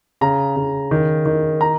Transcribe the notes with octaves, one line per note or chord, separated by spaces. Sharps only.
C#3 A#5
C#3
D#3
D#3
A#5